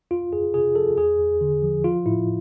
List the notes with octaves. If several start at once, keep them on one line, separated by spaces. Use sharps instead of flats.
F2 F4
F2 G#4
C3 G#4
F3 A4
E2 G#4
E2
D3
F3
F3 F4
A2 E4